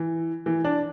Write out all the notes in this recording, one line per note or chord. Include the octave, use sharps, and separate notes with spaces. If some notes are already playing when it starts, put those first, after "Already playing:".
Already playing: E3
E3
D4